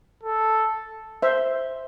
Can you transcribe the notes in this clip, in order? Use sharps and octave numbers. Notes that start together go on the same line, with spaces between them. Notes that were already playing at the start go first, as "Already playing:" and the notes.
A4
C5 E5